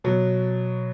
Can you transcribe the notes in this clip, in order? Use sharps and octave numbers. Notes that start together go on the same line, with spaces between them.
B2 F#3